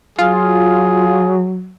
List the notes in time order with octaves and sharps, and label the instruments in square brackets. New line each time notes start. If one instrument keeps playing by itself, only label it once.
[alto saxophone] F#3 [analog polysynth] F4 [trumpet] G#4